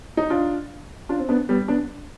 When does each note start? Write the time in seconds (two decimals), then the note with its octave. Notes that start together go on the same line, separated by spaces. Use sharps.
0.17 D#4
0.30 D4 F4
1.09 D4 F4
1.19 C4
1.29 B3 D4
1.49 G3 B3
1.68 B3 D4